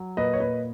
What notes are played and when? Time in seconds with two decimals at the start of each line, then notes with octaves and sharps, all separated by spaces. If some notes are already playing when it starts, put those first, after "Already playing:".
Already playing: F#3
0.17 A#2 B4 D#5
0.33 C#5
0.40 A#2 B4 D#5